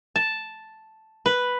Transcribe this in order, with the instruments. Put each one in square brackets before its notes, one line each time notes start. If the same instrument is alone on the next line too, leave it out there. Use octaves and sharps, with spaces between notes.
[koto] A5
B4